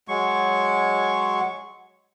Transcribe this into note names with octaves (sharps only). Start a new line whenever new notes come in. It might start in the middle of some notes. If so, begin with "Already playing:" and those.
F#3 G#3 C#6